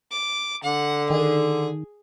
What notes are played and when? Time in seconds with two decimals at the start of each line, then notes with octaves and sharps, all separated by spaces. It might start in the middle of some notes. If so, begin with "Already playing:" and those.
0.11 D6
0.63 D3 F#5
1.10 D#3 G#4